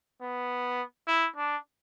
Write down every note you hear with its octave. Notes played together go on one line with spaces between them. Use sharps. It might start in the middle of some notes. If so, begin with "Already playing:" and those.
B3
E4
D4